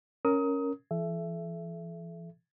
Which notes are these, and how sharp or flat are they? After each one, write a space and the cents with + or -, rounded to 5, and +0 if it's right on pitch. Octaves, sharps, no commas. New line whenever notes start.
C#4 +0 A#4 +0 D#6 +25
E3 +35 A4 -35 E5 +15